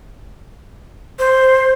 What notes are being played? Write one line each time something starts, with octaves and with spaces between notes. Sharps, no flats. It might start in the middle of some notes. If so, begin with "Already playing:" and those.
C5